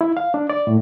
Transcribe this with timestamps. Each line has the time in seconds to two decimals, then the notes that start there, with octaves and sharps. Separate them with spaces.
0.01 E4
0.17 F5
0.34 D4
0.50 D5
0.67 A2